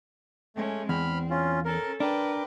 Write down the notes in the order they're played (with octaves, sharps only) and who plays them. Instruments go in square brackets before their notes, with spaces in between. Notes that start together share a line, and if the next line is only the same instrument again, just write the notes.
[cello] G#3 C#4 [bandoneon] A3
[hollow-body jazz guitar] E2 [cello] C4 [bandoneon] B5 F6
[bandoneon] C#4 F4
[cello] C#4 A4 [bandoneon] A#4
[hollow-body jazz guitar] D4 [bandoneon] A#4 D6 [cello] B4 G5